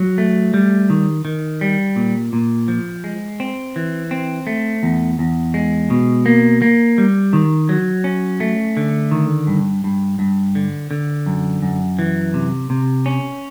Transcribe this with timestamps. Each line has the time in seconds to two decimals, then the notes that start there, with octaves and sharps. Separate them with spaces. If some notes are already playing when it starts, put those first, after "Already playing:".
Already playing: F#3
0.18 A3
0.54 G3
0.90 D#3
1.25 D#3
1.61 G3
1.96 A#2
2.33 A#2
2.68 F3
3.04 G#3
3.40 C4
3.76 E3
4.11 C4
4.47 A3
4.83 E2
5.19 E2
5.54 G#3
5.90 B2
6.26 A#3
6.62 A#3
6.98 G3
7.33 D#3
7.69 F#3
8.04 C#4
8.40 A3
8.77 D3
9.11 D#3
9.47 G2
9.84 G2
10.19 G2
10.55 D3
10.91 D3
11.26 F#2
11.62 F#2
11.99 E3
12.34 C3
12.70 C3
13.06 C#4